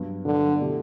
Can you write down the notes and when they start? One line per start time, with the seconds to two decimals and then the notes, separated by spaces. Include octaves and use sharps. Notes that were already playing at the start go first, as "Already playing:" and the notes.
Already playing: G2 F#3 B3
0.25 G2 D3 F#3 B3
0.59 B2 A3 E4 G4